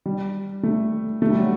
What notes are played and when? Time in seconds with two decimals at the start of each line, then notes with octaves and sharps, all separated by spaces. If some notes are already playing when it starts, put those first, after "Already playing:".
0.06 G3
0.63 A3
1.22 A3
1.30 G3
1.39 F#3